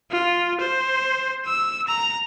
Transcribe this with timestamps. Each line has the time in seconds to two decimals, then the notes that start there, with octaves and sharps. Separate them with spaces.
0.11 F4
0.61 C5
1.46 E6
1.88 A#5